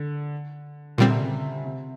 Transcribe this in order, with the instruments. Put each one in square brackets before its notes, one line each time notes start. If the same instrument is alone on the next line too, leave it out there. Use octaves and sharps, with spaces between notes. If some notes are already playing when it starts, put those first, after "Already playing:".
Already playing: [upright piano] D3
[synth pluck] A#2 G3 C4 [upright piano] D3
[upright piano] C3
C#3
C3